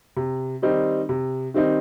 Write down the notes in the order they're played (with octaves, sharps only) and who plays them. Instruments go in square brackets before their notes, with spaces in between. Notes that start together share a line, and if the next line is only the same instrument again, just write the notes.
[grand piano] C3
D#3 G3 C4 D#4
C3
D#3 G3 C4 D#4